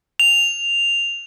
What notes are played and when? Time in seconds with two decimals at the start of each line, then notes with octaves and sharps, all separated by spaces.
0.20 F7